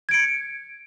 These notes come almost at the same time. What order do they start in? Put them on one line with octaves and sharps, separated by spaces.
G#6 D7 C#7